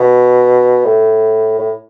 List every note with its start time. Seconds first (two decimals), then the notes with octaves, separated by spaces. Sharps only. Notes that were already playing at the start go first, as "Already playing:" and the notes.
Already playing: B2
0.85 A2
1.59 A2